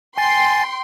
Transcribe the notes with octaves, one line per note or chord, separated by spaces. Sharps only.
G5 G#5 C6 A6 C7